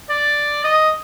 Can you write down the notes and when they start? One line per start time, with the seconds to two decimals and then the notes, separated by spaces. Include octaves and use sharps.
0.10 D5
0.64 D#5